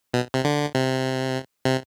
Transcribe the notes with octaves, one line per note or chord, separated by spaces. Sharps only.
B2
C3
D3
C3
C3